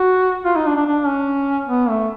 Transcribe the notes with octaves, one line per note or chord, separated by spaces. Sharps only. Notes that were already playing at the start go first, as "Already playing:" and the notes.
Already playing: F#4
F4
D#4
D4
D4
D4
C#4
B3
A3